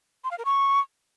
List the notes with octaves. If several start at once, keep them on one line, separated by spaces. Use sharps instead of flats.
C6
F5
A#4
C#6